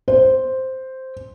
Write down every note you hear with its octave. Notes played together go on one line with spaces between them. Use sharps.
C5